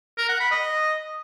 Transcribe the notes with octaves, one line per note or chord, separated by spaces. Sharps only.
A#4
F#5
B5
D#5